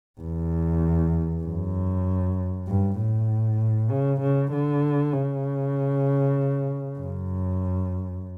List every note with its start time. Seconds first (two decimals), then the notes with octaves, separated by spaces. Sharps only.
0.20 E2
1.44 F#2
2.67 G2
2.98 A2
3.90 C#3
4.21 C#3
4.52 D3
5.13 C#3
6.99 F#2